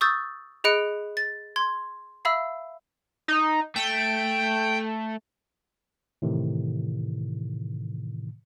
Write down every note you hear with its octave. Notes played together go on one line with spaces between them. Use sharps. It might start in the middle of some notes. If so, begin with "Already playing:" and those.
C#6 D#6 E6 G6 A6
G#4 D#5 B5 F#6 C#7 D7
A6
C6 G#6
E5 F5 B5 E6
D#4
A3 G5
A2 C3 D#3 E3